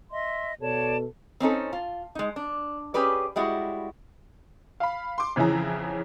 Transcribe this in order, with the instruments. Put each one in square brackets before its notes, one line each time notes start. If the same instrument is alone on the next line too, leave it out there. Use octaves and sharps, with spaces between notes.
[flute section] D#5 E5 C6
[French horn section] B2 A4 [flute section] C#5 D5 A5
[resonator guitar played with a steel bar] C4 C#4 D#4 A4
F4
G#3 D#4
D4
C#4 G4 G#4 B4 D5
G3 G#3 E4 F#4
[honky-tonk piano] F5 B5
C6 D6
F2 C#3 E3 E4 G#4 A#5